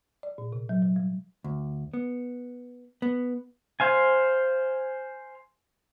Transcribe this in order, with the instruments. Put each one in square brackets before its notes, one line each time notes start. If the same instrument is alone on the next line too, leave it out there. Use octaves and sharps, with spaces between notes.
[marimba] D5
A#2
C3
F#3
F#3
G3
[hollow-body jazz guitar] D2
B3
B3
[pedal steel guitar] C5 F5 G#5